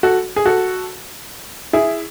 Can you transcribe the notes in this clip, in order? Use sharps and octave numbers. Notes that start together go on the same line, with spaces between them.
F#4 A4
G#4
F#4 A4
E4 G#4